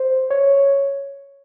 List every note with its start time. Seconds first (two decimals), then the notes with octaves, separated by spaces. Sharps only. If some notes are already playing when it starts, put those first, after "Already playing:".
Already playing: C5
0.30 C#5